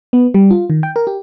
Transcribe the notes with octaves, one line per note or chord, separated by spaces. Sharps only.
B3
G3
F4
D#3
G5
A#4
G4